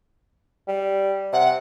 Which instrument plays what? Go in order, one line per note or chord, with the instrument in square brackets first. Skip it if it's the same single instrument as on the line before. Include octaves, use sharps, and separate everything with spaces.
[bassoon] G3
[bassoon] C3 [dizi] F#5